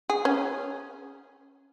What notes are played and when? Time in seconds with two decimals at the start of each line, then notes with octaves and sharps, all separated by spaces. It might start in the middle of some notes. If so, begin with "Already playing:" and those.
0.10 G#4
0.25 C#4